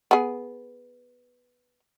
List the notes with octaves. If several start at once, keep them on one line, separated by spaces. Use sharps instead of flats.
B3 G#4